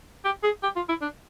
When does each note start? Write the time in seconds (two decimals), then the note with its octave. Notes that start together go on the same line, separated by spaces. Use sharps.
0.25 G4
0.43 G#4
0.63 G4
0.76 F4
0.89 E4
1.01 D4